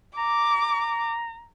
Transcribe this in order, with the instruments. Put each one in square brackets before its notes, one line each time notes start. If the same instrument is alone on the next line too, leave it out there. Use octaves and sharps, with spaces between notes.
[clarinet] A#5 [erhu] D6